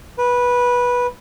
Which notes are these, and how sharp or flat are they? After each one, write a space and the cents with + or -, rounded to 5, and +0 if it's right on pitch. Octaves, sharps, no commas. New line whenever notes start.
B4 -15